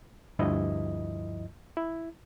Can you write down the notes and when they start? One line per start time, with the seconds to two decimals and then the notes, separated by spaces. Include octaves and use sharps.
0.39 D2 G2 F3 E4 D#5
1.77 E4